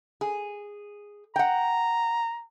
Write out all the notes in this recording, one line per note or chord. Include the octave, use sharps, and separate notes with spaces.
G#4
F#5 G5 A#5